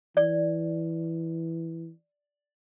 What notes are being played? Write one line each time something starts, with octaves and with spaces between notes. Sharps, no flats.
E3 D5